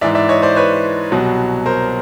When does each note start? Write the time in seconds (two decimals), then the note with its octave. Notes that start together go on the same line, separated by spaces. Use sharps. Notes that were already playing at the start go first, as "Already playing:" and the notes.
0.01 G#2 E3 D5 E5
0.15 D5 E5
0.29 C#5 D#5
0.42 C5 D5
0.56 B4 C#5
1.12 C2 B2 F#3
1.66 A#4 C5